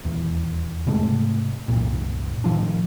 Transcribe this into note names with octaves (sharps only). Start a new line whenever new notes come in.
D#1 E2
G#2 C3 G#3 A3
F#1 C2 A#2
A2 D#3 F3 D4